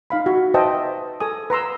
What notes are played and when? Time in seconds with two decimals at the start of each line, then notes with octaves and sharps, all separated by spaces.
0.10 D#4 F5 B5
0.26 F#4
0.54 B4 C5 D#5 E5 G5 A5
1.20 A4 G#5 D#6
1.50 B4 A#5 C6 E6